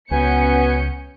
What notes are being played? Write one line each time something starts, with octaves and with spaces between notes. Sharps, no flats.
C#2 B3 C#4 F#4 B4 G#5 G6 C#7